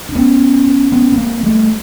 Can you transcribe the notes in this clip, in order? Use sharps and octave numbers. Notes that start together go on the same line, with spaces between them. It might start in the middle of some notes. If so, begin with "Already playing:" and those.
D4
B3 C#4
B3 C#4
B3
A#3 C4
G3 A3